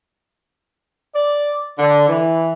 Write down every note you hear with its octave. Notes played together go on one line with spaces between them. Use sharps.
D5
D3
E3